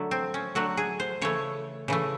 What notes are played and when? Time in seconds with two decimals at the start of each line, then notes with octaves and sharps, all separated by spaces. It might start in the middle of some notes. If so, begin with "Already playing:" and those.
Already playing: D3 F#3 A3
0.11 C4
0.34 C#4
0.55 D3 F#3 A3 F#4
0.77 G#4
1.00 C5
1.21 C#3 E3 A3 C#5
1.88 C#3 E3 A3